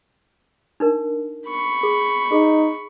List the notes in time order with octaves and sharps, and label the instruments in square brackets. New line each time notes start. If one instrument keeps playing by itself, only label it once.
[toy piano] D4 D#4 A#4
[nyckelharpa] B5 C#6
[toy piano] G#4
[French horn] D#4 [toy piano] G#4